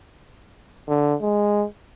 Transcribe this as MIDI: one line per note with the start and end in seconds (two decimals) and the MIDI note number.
0.88 1.15 50
1.22 1.65 56